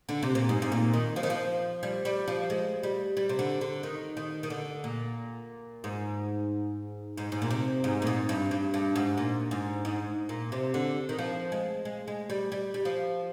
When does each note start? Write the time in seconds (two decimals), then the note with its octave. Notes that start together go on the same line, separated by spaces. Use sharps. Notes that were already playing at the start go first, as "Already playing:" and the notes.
0.09 D3
0.23 C3
0.35 A#2
0.49 G#2
0.62 G#2
0.72 A#2
0.94 D#3
1.16 F3
1.23 D#3
1.30 F3
1.83 G3
2.05 G3
2.28 F3
2.50 G#3
2.83 G3
3.17 G3
3.29 C3
3.39 D3
3.61 D3
3.83 D#3
4.17 D#3
4.43 D#3
4.50 D3
4.84 A#2
5.84 G#2
7.17 G#2
7.32 G#2
7.42 A#2
7.51 C3
7.84 G#2
8.02 A#2
8.07 G#2
8.29 G2
8.51 G2
8.74 G2
8.96 G#2
9.18 A#2
9.51 G#2
9.85 G#2
10.29 A#2
10.52 C3
10.74 D3
11.09 D#3
11.19 F3
11.52 G#3
11.85 G#3
12.08 G#3
12.30 G3
12.52 G3
12.74 G3
12.85 F3